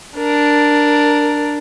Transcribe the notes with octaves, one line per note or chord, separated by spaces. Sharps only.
D4 A#4